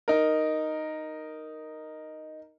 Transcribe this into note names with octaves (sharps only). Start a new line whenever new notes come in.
D#4 A#4